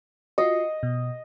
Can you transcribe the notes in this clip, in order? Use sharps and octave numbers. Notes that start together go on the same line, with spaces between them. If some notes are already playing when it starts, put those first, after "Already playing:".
F4 F#4 D#5
B2